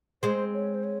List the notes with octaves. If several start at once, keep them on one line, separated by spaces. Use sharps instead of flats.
G#3 C4 C5
C#5
C5
C#5